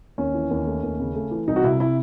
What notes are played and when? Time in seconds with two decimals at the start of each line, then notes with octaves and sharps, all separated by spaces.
0.18 D#2 C#4
0.34 E3
0.51 D#2
0.67 A3
0.83 D#2
1.00 C#3
1.15 A3
1.31 E3
1.48 C2 D#4
1.56 F#4
1.64 C3 E4
1.80 E4